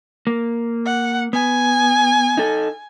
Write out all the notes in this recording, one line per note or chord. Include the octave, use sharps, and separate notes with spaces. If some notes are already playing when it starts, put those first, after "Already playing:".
A#3
F#5
B3 G#5
D#4 A4